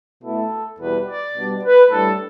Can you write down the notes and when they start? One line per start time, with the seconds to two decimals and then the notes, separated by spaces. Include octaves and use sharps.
0.23 B2 A3 E4 A4
0.79 E2 B2 G3 B4
1.07 D5
1.35 B2 G3 D4
1.63 B4
1.91 A2 G3 D4 A4